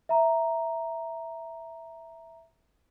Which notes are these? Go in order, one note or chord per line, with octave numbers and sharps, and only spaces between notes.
E5 A#5